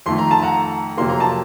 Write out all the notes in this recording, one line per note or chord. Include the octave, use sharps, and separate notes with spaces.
F2 D#3 A3 C6
A#5
A5
F#5 A#5
F2 C3 F#3 A#3 C6
A#5
A5